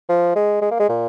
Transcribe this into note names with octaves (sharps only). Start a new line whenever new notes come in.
F3
G#3
G#3
A#3
G#3
A#2